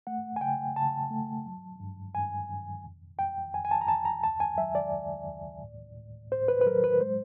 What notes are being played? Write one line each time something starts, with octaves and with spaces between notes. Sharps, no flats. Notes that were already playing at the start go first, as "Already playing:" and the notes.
A3 F#5
G#5
C#3 G5
C#3 A5
A3
F#3
G2
G2 G#5
G2
F2
F2 G5
F2 G#5
G#5
A5
A#5
F2 A5
A#5
D2 A5
G#5
F#3 E5
D5
D2
D2
A2
A2
A2 C5
B4
B4
F#3 A#4
B4
G#3 C5